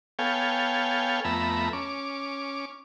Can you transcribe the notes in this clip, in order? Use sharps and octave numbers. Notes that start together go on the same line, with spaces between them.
B3 A4 C#5 F5 G5 G#5
F2 A3 B3 E5 A#5 B5
C#4 D6